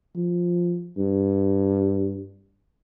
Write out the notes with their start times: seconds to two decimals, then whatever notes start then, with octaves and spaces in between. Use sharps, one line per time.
0.16 F3
0.98 G2